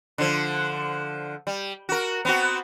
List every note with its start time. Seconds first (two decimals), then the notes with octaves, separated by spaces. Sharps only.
0.18 D3 F3
1.47 G3
1.89 F#4 A#4
2.25 B3 C4 F#4